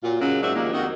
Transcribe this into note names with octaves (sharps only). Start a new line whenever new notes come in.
A#2 F#3 F4
C#3 F#3 G#3 A#3 C#4
G#2 F#3 F#4 C5 D5 E5
D#3 F3 G3 G#3 A#3 D#4
F2 D#3 F#4 D#5